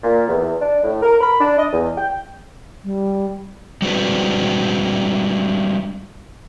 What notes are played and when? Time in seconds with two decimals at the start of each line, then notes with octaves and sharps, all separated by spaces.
0.03 A#2
0.28 E2
0.61 D4
0.84 A2
1.02 A#4
1.21 B5
1.40 D4
1.58 D#5
1.73 E2
1.97 G5
2.83 G3
3.82 G3 G#3 C4 D4 F#4 B4